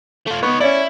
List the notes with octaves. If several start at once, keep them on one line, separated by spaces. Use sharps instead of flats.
A3 F4
B3 D#4 C#5
C#4 E4 C#5 D5